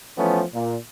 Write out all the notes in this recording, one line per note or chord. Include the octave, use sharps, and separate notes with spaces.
E3 F3 A3 B3 C#4
A#2